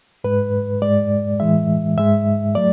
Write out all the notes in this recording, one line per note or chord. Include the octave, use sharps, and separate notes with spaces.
G#2 G#3 B4
G#2 G#3 D5
A2 E3 G#3 E5
G#2 G#3 E5
F#3 A3 D5